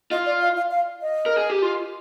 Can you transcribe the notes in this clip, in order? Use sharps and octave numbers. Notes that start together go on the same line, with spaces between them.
F4 D#5
D5
F5
F5
F5
D#5
A#4
G#4
G4
F4